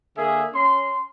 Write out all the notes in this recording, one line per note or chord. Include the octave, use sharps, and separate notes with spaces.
D3 A#3 G#4 E5
C#4 C6